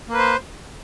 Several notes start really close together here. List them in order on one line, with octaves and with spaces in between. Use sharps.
A#3 B4 C5